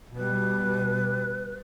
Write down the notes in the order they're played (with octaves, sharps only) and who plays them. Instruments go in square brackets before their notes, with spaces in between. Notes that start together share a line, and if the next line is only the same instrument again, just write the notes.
[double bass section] B2 G3 [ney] B4